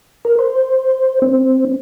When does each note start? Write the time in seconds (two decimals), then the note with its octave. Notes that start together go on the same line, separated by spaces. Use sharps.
0.25 A#4
0.39 C5
1.22 C4